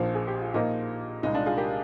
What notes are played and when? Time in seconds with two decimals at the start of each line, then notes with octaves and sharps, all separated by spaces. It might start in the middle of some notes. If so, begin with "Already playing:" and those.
Already playing: A#1 A#2 F3 D#4
0.15 G#4
0.28 G4
0.41 F4
0.54 A#2 F3 A#3 D#4
1.23 C2 A#2 G#3 D#4
1.34 D4 F4
1.46 F4 G#4
1.57 G4 A#4